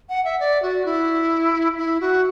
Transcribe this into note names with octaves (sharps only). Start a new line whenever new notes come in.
F#5
E5
D5
F#4
E4
E4
F#4